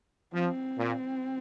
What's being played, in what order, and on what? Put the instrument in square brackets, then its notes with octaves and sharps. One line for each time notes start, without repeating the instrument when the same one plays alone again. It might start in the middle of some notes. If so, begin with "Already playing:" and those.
[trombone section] F3 [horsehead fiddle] C4
[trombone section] A#2